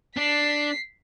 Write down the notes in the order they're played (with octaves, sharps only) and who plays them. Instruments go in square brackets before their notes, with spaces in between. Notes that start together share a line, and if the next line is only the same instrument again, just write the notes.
[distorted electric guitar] D4 [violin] B6 C7